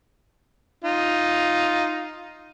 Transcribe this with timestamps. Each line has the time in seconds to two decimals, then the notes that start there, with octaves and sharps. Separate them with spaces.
0.85 D#4 F4